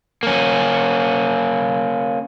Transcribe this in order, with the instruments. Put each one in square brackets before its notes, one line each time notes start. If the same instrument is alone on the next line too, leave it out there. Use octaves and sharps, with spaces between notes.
[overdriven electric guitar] A#3 C#4